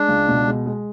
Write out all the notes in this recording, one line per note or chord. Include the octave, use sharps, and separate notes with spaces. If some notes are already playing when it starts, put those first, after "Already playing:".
Already playing: G#3 D4
C#2
B2
G#3
G#3